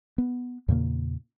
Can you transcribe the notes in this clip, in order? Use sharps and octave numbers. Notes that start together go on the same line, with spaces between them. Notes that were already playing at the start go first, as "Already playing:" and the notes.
B3
E2 A#2 C#3 A#3